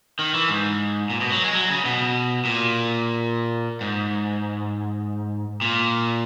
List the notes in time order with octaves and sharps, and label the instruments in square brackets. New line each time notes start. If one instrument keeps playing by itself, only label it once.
[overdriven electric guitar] D#3
E3
G#2
A#2
B2
F#3
G#3
F#3
C#3
B2
A#2
G#2
A#2